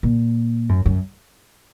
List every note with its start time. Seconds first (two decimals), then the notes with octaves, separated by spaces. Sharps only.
0.03 A#2
0.69 F#2
0.86 F#2